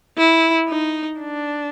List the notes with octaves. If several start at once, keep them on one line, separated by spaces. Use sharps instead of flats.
E4
D#4
D4